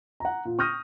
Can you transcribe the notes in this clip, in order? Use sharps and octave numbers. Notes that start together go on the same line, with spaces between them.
F#5 A#5
A#2
C#6 D#6 F6 G6 A#6 D#7